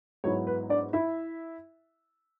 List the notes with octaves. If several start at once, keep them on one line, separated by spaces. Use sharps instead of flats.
G#2 F#3 B3 E4 C#5
B4
D4 D5
E4 E5